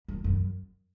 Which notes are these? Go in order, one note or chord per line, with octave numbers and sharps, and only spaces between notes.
F#2
F#2